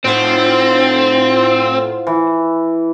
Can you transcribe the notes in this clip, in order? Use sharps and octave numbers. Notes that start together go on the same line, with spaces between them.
A2 C4 F4 C5 F#5
E3